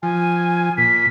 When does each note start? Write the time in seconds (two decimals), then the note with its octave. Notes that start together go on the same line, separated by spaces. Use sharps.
0.03 F3 G#5
0.78 A#2 B6